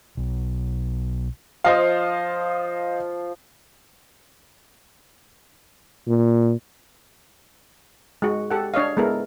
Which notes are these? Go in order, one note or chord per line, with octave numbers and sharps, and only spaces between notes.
B1
F3 C5 D#5 F5
A#2
G#3 F#4
G4 A4 F#5
D4 C#5 D#5 F5
G#3 B3 E4 A4 A#4